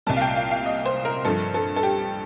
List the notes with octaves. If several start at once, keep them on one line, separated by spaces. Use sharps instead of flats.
C2 A#2 G3 A5
F5
G5
F5
F5
D#5
C5
A#4
G2 F3 A4
A4
A4
G4